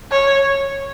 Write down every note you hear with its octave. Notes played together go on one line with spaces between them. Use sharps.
C#5